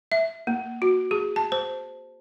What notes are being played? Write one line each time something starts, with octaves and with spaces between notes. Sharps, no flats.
E5
A#3
F#4
G#4
A5
C5